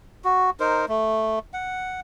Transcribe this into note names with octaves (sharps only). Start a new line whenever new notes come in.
F#4
D#4 A#4 C5
A3
F#5